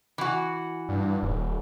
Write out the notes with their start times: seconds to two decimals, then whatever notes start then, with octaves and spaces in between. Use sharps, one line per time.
0.18 E3 F#4
0.89 G2
1.23 D#1